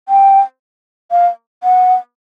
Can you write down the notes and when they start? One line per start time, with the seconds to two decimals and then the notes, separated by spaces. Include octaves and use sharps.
0.09 G5
1.11 F5
1.63 F#5